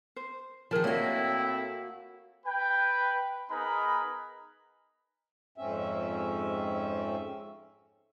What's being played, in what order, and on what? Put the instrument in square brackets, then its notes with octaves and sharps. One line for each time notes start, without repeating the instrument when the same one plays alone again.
[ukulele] C5
[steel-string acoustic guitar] D#3 F3 [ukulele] G#4 A#4 A5
[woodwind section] A2 C4 E4 [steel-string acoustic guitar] A#3 F#4 [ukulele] D5 D#5
[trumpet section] B4 G5
B3 D#4 G#4 A#4 B4 B5
[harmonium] F2 G#2 C4 C#4 E5